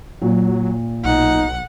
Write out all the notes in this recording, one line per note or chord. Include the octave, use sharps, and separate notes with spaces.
A#2 F#3
B1 D#4 F#5